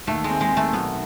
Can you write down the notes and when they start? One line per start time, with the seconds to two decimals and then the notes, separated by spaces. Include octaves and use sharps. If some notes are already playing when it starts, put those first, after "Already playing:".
0.07 D#2 A3
0.24 G#3
0.30 C4
0.41 G#3
0.52 D#3 A3
0.73 B1 B3